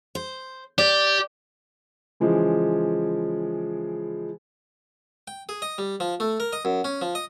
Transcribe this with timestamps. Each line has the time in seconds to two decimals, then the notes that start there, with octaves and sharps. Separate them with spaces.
0.15 C5
0.78 G4 D5
2.20 C#3 E3 F3 G#3
5.28 G5
5.49 G#4
5.62 D#5
5.78 G3
6.00 F3
6.20 A3
6.40 A#4
6.53 D#5
6.65 F#2
6.84 C#4
7.02 F3
7.15 D#5